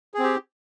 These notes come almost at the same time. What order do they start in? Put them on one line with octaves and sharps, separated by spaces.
G#4 C4 G4